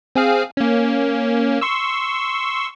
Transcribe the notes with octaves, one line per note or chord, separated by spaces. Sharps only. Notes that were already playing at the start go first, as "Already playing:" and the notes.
C4 G#4 F5
A#3 C#4
C6 C#6 E6